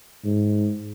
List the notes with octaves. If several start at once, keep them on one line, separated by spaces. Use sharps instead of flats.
G#2